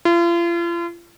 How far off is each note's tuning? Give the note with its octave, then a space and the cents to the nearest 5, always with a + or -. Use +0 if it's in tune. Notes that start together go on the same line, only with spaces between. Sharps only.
F4 -40